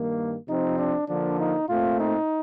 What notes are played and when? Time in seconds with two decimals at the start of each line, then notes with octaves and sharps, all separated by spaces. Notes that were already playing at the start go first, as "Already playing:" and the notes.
Already playing: G2 D#3 A#3
0.48 C3 F3 C4 D#4
0.79 D4
1.08 D3 F3 A#3 D4
1.39 D#4
1.69 A#2 A3 C4 F4
1.98 D#4